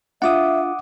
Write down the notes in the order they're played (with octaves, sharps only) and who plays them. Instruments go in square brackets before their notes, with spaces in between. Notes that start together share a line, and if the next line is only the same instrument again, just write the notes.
[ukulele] D4 F4 [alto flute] E5 [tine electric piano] F#5 D6 D#6